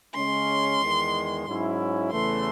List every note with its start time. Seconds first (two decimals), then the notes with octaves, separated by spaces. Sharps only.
0.15 C#3 G#3 C#4 C6
0.80 E2 D#3 G#3
1.47 G#2 F#3 C#4 E4
2.12 E2 C#3 E3 A3 C6